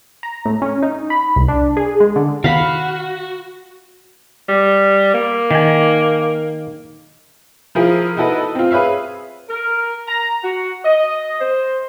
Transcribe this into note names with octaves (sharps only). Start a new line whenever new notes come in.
A#5
A2
C#4
D#4
B5
C2
D4
G#4
G#3
D3
D#3 F#4 F5 B5
G3
A#3
D#3 G#5
F3 E4 F4 G#4 A#4
D#4 E4 F#4 A4 B4 D#5
C4 F4
G#4 B4 C#5 E5 F5
A#4
A#5
F#4
D#5
C5